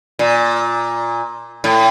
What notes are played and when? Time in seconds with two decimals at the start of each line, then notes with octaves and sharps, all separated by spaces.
0.19 A#2
1.64 A2